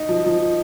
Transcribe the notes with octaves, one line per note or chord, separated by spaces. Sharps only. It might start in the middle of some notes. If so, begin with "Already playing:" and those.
Already playing: D#4
F3
F3